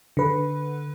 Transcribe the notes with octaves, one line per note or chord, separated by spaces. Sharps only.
D3 B4